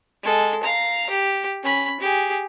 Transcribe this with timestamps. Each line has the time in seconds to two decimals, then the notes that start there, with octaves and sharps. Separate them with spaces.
0.23 G#3 A4
0.63 F5 A#5
1.10 G4
1.63 C#4 B5
2.00 G4 G#4